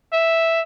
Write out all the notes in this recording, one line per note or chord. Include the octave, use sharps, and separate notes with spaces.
E5